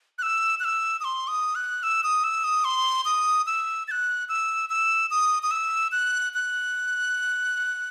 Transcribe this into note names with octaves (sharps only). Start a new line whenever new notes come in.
F#6
E6
F#6
E6
D#6
C6
D#6
F#6
E6
D#6
E6
D#6
C6
D#6
E6
A6
F#6
E6
E6
D#6
D#6
E6
F#6
F#6